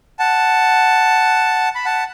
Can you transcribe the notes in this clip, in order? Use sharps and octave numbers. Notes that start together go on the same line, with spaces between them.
F#5 A5
B5
F#5 A5